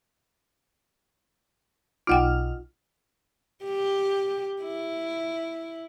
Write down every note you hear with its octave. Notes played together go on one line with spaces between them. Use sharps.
B1 D#4 F4 F#5 G5 F6
G4
E4